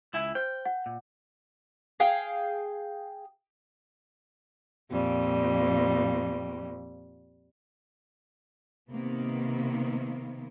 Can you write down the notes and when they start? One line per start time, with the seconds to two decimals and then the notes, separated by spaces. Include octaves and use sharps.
0.14 C#2 E4 G#5
0.35 C5 G5
0.65 F#5
0.86 A#2
2.00 G#4 F5 G5
4.89 F2 A#2 G3
8.90 C3 D#3 A#3 B3